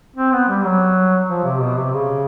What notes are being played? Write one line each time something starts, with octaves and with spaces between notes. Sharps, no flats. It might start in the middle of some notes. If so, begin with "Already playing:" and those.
C4
B3
G3
F#3
F3
C3
B2
C3
C#3